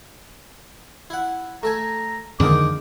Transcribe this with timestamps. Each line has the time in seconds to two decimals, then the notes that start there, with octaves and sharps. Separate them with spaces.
1.10 E4 F#5
1.63 A3 A4 G#5 A#5
2.40 F2 D3 D#3 G#3 A#3 D#4 D6